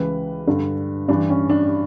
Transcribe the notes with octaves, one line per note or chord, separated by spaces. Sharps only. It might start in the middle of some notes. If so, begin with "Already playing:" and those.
Already playing: C#2 C#3 E3 B4
G2 D3
G2 E3 D4
C#4
D4